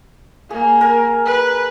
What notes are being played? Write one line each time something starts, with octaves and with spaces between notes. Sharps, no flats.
A#3 G#4
A#4 G#5
B4